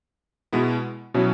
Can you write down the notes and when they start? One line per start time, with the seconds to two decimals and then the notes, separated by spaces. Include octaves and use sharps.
0.53 B2 G#3 B3 E4
1.14 B2 F#3 C#4 E4